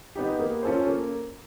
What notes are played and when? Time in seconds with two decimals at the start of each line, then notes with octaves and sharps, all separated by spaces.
0.15 B3 D#4 G4
0.39 A#3
0.63 C#4 F4 A4 C5
0.87 A#3